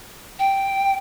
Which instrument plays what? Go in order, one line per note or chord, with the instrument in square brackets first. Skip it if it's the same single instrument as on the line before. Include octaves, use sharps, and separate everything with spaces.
[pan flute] G5